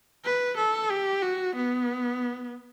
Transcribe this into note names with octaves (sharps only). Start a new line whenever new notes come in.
B4
A4
G4
F#4
B3